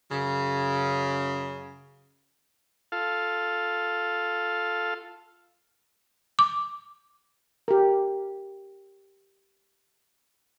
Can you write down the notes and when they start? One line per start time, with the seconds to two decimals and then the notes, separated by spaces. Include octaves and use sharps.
0.11 F#2 C#3
2.92 F4 A4 F5
6.39 D6
7.68 G4 A#4